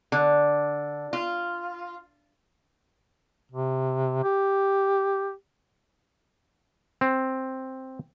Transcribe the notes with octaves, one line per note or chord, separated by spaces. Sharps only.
D3
F4
C3
G4
C4